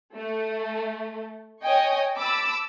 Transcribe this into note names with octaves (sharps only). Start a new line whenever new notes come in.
A3
C#5 D#5 G5 G#5 C#6 D#6
A5 B5 D6 E6